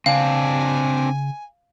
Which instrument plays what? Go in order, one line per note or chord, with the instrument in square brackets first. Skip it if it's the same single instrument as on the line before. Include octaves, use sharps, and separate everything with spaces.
[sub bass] C#3 [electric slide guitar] C4 D4 [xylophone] F5 [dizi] G#5